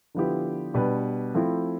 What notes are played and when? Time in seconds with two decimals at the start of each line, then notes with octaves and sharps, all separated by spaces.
0.14 D3 F3 B3 E4 G4
0.74 B2 G3 D4 G4 B4
1.34 F3 A3 C4 E4